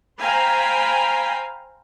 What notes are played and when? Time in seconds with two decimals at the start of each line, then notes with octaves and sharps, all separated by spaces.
0.20 C5 F5 G5 G#5 A#5 B5